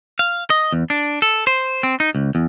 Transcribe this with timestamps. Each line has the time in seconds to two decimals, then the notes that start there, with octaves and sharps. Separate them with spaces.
0.19 F5
0.50 D#5
0.72 E2
0.90 D4
1.22 A4
1.47 C5
1.83 C4
2.00 D#4
2.15 C#2
2.35 E2